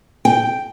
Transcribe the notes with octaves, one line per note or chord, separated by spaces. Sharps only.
G5